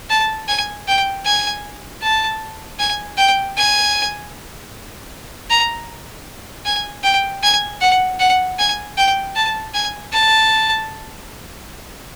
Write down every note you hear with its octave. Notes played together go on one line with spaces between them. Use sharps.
A5
G#5
G5
G#5
A5
G#5
G5
G#5
A#5
G#5
G5
G#5
F#5
F#5
G#5
G5
A5
G#5
A5